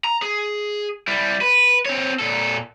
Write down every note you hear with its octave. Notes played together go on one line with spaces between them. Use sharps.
A#5
G#4
G3 E4
B4
C4 C#5
A#2 A4